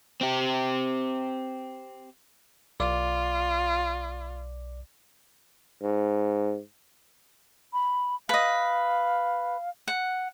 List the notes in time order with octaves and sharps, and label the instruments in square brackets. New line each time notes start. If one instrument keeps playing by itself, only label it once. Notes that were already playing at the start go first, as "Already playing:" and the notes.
[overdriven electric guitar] C4 G4
[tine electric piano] B1 D5 D6 [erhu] F4
[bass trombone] G#2
[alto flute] B5
[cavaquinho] B4 D#5 [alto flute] F5
[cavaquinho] F#5